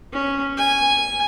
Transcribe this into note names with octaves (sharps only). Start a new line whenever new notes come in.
C#4
G#5